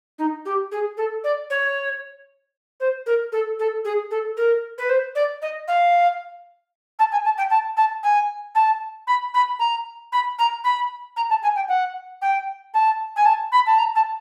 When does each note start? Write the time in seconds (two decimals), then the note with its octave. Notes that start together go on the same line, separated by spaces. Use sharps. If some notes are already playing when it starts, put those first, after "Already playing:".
0.19 D#4
0.45 G4
0.72 G#4
0.97 A4
1.24 D5
1.50 C#5
2.80 C5
3.06 A#4
3.32 A4
3.59 A4
3.85 G#4
4.11 A4
4.37 A#4
4.78 B4
4.89 C5
5.15 D5
5.42 D#5
5.68 F5
6.99 A5
7.12 G#5
7.25 A5
7.38 G5
7.50 A5
7.77 A5
8.03 G#5
8.55 A5
9.07 B5
9.34 B5
9.59 A#5
10.12 B5
10.39 A#5
10.64 B5
11.16 A#5
11.30 A5
11.43 G#5
11.56 G5
11.68 F#5
12.22 G5
12.74 A5
13.16 G#5
13.25 A5
13.52 B5
13.66 A5
13.78 A#5
13.95 A5